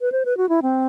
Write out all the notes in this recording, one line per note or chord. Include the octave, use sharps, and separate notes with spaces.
B4
C5
B4
F#4
E4
C4